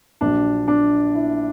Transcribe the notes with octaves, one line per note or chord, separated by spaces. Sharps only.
A#1 A#2 F#3 D4
D4
E4